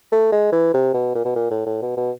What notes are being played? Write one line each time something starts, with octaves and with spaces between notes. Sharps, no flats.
A3
G#3
E3
C3
B2
A#2
B2
A#2
A2
A2
B2
B2